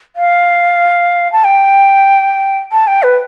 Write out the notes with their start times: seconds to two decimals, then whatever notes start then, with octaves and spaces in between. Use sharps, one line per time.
0.16 F5
1.32 A5
1.44 G5
2.72 A5
2.87 G5
3.03 B4